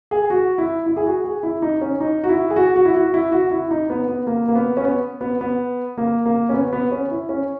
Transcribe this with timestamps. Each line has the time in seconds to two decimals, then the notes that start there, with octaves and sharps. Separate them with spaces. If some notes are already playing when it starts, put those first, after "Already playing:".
0.11 G#4
0.30 F#4
0.58 E4
0.86 E4
0.96 G#4
1.06 F#4
1.24 G#4
1.43 E4
1.62 D#4
1.81 C#4
2.00 D#4
2.24 F#4
2.29 E4
2.50 G#4
2.56 F#4
2.76 F#4
2.85 E4
2.94 F#4
3.14 E4
3.32 F#4
3.51 E4
3.71 D#4
3.90 B3
4.08 B3
4.27 A#3
4.48 A#3
4.55 B3
4.77 C#4
4.84 B3
5.21 B3
5.41 B3
5.98 A#3
6.26 A#3
6.49 C#4
6.54 B3
6.73 B3
6.91 C#4
7.11 E4
7.29 C#4